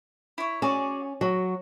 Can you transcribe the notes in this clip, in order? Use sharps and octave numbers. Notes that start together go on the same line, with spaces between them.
E4 C#5
C#4 F#4 G#4 D5
F#3 F#4